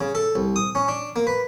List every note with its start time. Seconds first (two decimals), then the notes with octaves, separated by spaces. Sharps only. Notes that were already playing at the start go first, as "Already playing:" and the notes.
0.01 C#3
0.15 A4
0.35 C2
0.56 D#6
0.75 C#4
0.88 D4
1.16 A#3
1.27 B4